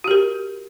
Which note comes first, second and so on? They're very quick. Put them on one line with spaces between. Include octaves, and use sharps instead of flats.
F#4 G4 A#4